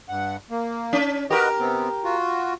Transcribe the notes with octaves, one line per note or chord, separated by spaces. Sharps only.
G2 F#5
A#3
C#4
F#4 G4 A#4 B4 D#5
C3 B3 C4
F4 F#4